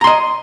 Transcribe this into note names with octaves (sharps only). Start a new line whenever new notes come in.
D#5 A#5 C6